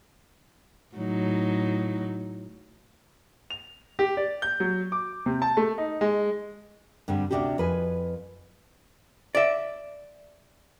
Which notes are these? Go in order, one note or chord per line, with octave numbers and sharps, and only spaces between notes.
A2 F#3 D#4
F7
G4
D5
G6
F#3
D6
C3
A5
A3
D#4
G#3
G2 D3 G3 C4
D2 G2 C3 D4 F#4 G4
F2 B4 G#5
D5 E5